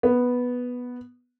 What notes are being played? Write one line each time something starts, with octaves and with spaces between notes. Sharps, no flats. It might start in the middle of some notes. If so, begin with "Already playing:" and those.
B3